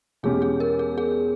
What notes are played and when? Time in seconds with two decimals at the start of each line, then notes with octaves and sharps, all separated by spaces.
0.23 E2 B2 G#3 C#4 G4 G#4
0.42 G#4
0.60 A#4
0.79 G#4
0.98 G#4